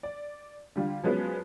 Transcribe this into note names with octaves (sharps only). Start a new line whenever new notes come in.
D5
D3 G3 F4
F3 F#3 G#3 B3 C#4